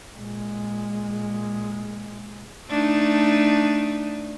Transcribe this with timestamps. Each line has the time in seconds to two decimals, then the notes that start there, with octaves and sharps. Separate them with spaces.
0.16 A#2 G#3
2.68 A3 D4 D#4